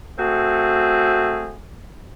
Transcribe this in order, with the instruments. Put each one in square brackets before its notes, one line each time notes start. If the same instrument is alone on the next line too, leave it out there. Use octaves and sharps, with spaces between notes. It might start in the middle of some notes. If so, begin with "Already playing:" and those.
[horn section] A3 C4 F#4 G#4